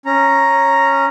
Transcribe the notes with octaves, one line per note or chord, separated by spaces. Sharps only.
C#4 A#5